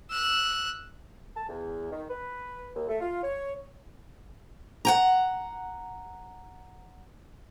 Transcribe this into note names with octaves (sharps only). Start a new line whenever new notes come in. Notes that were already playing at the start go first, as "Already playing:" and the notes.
E6 F#6
A5
E2
D#3
B4
D#2
A3
F4
C#5
F#5 G5 A#5